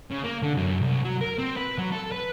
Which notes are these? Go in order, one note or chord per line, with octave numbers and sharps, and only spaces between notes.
C#3
A#3
D3
F#2
C2
F#3
A#4
C4
B4
F#3
A4
B4